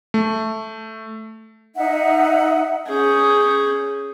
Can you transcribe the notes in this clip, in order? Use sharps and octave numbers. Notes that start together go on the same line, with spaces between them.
A3
D#4 E5 F#5
C#4 G#4 G6